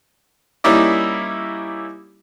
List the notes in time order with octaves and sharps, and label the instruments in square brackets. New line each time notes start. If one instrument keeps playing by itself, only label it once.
[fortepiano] G3 A#3 C#4 D#4 E4 D5